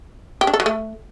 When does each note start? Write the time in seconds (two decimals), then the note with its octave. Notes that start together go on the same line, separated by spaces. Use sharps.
0.41 G4
0.47 D4
0.54 A4
0.60 F#3
0.66 A3